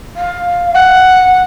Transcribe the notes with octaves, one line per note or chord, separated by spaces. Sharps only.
F5
F#5